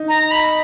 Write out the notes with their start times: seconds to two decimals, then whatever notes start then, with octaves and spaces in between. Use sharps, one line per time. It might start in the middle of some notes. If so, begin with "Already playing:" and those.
Already playing: D#4
0.08 A#5
0.31 B5